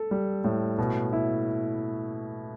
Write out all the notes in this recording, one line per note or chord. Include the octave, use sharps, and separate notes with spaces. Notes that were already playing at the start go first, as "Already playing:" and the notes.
Already playing: A4
G3
A2
B2
E4